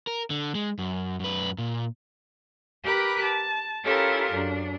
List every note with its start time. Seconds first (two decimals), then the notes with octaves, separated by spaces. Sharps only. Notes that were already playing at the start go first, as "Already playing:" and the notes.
0.07 A#4
0.30 D3
0.55 G#3
0.79 F#2
1.20 F#2 B4
1.58 A#2
2.85 G4 A#4 B4 B5 D6 F#6
3.23 A5
3.84 C#4 E4 F4 G4 A4 A#4
4.32 F#2 D4